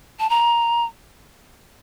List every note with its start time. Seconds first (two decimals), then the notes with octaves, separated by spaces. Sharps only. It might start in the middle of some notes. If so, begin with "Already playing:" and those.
0.20 A5
0.30 A#5